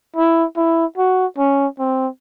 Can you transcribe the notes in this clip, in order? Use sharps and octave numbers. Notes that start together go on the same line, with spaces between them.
E4
E4
F#4
C#4
C4